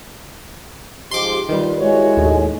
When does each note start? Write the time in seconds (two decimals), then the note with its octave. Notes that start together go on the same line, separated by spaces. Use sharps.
1.11 G#2 F3 G#3 G4 C6 D6
1.49 D#3 G3 F4 B4
1.80 G#3 E4 F#4 C#5
2.17 D#2 A2